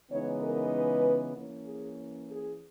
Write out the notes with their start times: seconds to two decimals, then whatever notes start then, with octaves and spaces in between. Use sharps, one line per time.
0.10 C#3 E3 G#3 B3 D#4 C#5
0.42 A#4
0.73 B4
1.35 E3 A#3 C#4
1.66 G#4
2.29 G#4